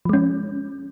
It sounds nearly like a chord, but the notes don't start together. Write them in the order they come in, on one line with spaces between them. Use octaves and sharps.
F3 G#3 C#4